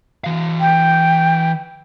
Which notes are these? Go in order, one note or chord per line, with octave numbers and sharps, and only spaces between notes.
E3 F5
G5